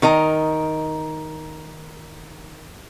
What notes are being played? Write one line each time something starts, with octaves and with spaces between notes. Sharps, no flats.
D#3 A#4 D#5 A#5